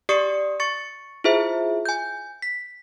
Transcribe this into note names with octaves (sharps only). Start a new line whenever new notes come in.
G4 D5 C#6 D#6 C7 C#7
C#6 A6 C#7
E4 F4 G#4 C5 E5
G#5 G6
B6